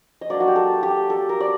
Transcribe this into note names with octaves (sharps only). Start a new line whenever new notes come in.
D#5
F#3 A#3 D4 D5
F#4
G4
A4
G4
A4
A#4
D5